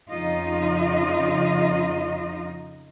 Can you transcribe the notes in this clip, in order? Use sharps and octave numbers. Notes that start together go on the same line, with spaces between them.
F2 C#3 D#4 F4 D#5